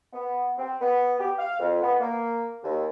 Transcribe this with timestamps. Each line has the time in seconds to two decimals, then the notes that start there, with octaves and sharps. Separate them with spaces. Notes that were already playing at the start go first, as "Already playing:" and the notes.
0.13 B3
0.58 C4
0.81 B3
1.19 G4
1.38 F5
1.59 F2
1.82 B3
2.00 A#3
2.63 D#2